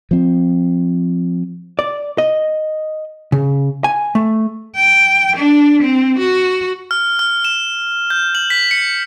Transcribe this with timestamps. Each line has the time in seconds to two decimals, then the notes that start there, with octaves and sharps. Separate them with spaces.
0.11 F3 C4
1.79 D5
2.18 D#5
3.32 C#3
3.84 G#5
4.15 A3
4.75 G5
5.36 D4
5.82 C4
6.18 F#4
6.91 F6
7.19 F6
7.45 E7
8.10 G6
8.35 F#7
8.50 B6
8.71 C#7